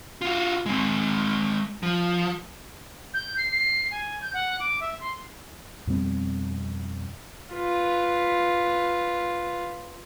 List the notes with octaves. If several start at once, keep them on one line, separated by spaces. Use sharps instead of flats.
F4 F#4
G#3 C4
F3
G6
C7
C7
G#5
G6
F#5
D6
E5
C6
F2 B2 G3 C4
F4 B4